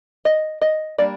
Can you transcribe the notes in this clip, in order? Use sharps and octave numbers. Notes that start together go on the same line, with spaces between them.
D#5
D#5
G3 A#3 D4 D5